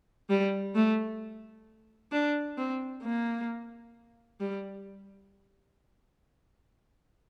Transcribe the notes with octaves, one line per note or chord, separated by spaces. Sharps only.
G3
A3
D4
C4
A#3
G3